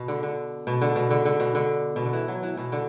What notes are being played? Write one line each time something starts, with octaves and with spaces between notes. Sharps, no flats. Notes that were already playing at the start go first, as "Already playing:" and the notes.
Already playing: B2
D3
D3
B2
D3
B2
D3
D3
B2
D3
B2
D3
E3
F#3
E3
B2
D3